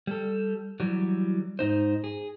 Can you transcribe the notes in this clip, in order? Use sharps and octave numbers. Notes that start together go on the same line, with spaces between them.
G3 A4
E3 F#3 G3
G#2 D#4 C5
G#4